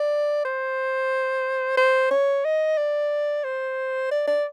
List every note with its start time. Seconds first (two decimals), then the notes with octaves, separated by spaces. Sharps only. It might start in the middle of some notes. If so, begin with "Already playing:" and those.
Already playing: D5
0.45 C5
1.77 C5
2.11 C#5
2.45 D#5
2.77 D5
3.44 C5
4.11 D5
4.28 D5